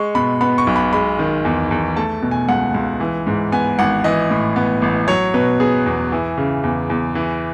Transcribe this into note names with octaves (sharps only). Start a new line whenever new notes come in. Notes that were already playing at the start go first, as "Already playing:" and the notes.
Already playing: G#3 C#6
B2 B5
B3 B5
C#6
B1
B5
G#3 B5
D#3
E2
E2
A3 A5
B2
G#5
C#2 F#5
C#2
E3
G#2
B3 G#5
G#1 F#5
E3 D#5
A2
B3
A1
F#3 C#5
B2 B4
B3 G#4
E2
E3
C#3
E2
E2
E3